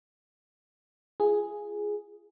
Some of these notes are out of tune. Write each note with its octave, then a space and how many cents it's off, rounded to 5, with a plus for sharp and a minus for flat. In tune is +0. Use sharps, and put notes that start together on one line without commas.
F4 -30 G#4 +0